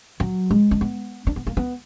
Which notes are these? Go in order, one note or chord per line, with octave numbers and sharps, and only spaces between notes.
F#3
G#3
D4
B3
D4
B3
A#3
B3